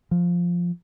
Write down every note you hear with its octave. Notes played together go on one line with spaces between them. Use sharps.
F3